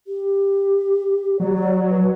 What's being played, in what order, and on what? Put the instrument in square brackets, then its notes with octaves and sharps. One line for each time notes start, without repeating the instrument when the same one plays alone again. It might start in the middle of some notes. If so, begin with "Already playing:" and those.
[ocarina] G4
[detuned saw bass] F#3 [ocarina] D5
[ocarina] B4